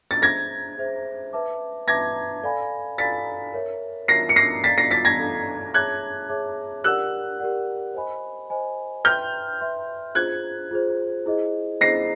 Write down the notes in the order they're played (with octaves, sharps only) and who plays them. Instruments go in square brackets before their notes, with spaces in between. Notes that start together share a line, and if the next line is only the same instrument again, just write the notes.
[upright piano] A6
[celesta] G#4 C5 E5 [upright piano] G#6 A#6
[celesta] G#4 C5 E5
B4 E5 A5 D6
[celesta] B4 E5 A5 D6 [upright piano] G#6 A#6
[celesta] A4 D5 F5 G#5 B5
[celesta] A4 D5 F5 G#5 B5 [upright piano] A6 B6
[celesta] A#4 C#5 E5
[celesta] A#4 C#5 E5 [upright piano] A#6 C7
[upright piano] C#7
A#6 C7
[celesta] A4 D5 F5 A#5 [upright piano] A6 B6
[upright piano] A#6 C7
A6 B6
G#6 A#6
[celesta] A4 D5 F5 A#5
[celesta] G#4 C#5 E5 A5 D6 [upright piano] F#6 G#6
[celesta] G#4 C#5 E5 A5 D6
[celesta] G4 A#4 D5 F#5 [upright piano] E6 F#6
[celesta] G4 A#4 D5 F#5
C5 D#5 G#5 B5
C5 D#5 G#5 B5
[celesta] B4 E5 G5 C6 [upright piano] F6 G6
[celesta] B4 E5 G5 C6
[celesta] F4 G#4 C5 [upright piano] F#6 G#6
[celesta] F4 G#4 C5
E4 G#4 C5 D#5
[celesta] E4 G#4 C5 D#5 [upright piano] A#6 C7